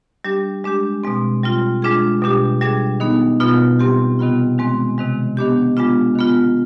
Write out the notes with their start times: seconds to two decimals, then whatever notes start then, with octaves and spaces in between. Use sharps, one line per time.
0.25 G3 D4 G4
0.64 G#3 D4 G4
1.04 B2 G#3 C4
1.43 G3 C4 F4
1.82 G#3 D4 F4 G#4
2.22 B2 G3 D4 G4
2.61 G3 D4 G#4
3.00 D#3 B3 D#4
3.40 B2 B3 F4
3.79 G3 C4 G4
4.19 C3 D#3 G3 B3 F4
4.58 D#3 G#3 C4
4.98 C3 D#3 G#3
5.37 D#3 B3 D4 G4
5.77 G#3 B3 D4 F4
6.15 D#3 B3 F4